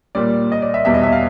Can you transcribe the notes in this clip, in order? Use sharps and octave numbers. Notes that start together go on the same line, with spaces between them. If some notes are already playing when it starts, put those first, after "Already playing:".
A#2 G3 D5
D#5
D5
E5
E2 B2 G3 E5
D#5
E5
F5